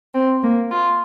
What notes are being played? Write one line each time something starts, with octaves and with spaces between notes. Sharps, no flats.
C4
A#3
F4